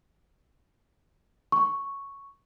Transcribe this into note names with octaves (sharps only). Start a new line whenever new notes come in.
C#6